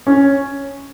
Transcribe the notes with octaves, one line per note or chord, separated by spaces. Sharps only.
C#4